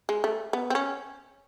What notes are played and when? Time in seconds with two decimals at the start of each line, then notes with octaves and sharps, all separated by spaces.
0.09 G#3
0.24 A3
0.53 B3
0.70 C4
0.75 C#4